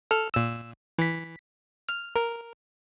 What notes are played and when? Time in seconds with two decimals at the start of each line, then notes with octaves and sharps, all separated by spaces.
0.11 A4 F6
0.34 A#2 E6
0.98 E3 B6
1.89 F6
2.16 A#4